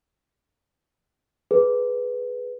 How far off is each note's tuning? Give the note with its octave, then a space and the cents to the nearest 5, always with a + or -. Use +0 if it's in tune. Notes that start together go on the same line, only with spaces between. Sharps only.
G#4 +15 B4 +0